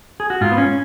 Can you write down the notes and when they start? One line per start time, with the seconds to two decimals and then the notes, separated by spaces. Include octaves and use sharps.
0.20 G#4
0.30 F#4
0.41 G#2 F4
0.52 B3
0.58 C#4